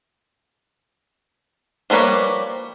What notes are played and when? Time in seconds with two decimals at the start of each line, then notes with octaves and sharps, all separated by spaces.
1.90 F3 G3 A#3 B4 C#5